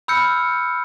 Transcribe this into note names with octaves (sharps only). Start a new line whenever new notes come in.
B5 E6 F6 G6 C#7